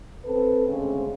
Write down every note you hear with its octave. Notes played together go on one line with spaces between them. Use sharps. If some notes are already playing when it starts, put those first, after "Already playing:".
C4 A4 B4
D2 C#3 G#3 C4 C#4